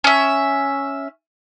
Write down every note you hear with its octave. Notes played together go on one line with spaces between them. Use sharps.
C#4 E5